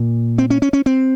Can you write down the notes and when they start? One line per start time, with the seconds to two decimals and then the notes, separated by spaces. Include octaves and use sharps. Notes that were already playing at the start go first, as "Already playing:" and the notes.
Already playing: A#2
0.38 C4
0.50 C#4
0.62 C#4
0.73 C#4
0.86 C4